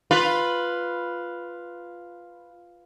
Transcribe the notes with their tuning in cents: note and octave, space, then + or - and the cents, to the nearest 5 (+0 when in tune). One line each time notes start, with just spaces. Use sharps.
F4 +0 B4 +0